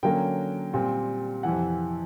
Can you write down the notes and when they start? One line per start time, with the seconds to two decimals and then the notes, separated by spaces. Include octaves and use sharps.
0.03 D3 F#3 A#3 C#4 G5
0.73 A#2 G3 C4
1.43 F2 C3 E3 F#5